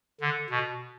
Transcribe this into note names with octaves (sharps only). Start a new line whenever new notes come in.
D3
B2